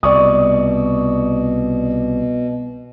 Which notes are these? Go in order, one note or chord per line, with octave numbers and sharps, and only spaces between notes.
C2 B2 D5 C#6 D#6